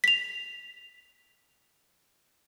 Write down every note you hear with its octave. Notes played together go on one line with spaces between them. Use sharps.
B6 F7